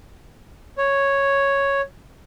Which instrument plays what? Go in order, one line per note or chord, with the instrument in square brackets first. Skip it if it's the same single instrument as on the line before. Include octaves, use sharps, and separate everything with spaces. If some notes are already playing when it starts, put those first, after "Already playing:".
[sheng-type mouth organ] C#5